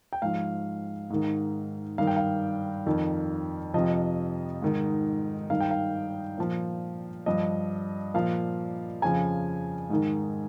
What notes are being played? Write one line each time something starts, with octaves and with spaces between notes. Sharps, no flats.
G5
G#2 F3 F5
G#2 D#3
G2 D#3 F5
G5
F5
F2 D#3
F2 C3 F3 D#5
G#2 D#3
G2 D#3 F5
G5
F5
A#2 F3
G2 F3 D#5
A#2 F3 F5
F2 C#3 F3 G#5
G#2 D#3